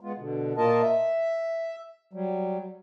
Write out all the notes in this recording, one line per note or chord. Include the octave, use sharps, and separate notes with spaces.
G#3 B3 F4
B2 D3
A#2 A#3 F4 A#4 D#5 A5
E5
F#3 G3